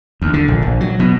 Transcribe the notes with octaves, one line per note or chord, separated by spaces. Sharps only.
D2
D3
A#1
A#1
F#3
B2